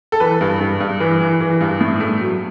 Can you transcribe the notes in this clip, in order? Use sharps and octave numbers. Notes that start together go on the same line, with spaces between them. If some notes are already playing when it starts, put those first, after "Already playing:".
A4
E3 B4
G2
G2
G2
E3 B4
E3
E3
G2
A2
A3
F#3